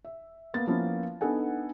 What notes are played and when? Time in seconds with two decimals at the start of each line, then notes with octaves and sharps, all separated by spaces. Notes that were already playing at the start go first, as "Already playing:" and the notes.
0.05 E5
0.54 A#3 B3 A6
0.67 F3 A#3 B3 C#4 E4
1.21 B3 D4 D#4 A4 F#5 G#5